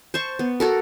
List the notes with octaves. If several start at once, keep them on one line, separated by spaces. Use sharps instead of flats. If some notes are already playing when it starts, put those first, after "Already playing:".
C5 A5 C#6
B3
F#4 A4 A#4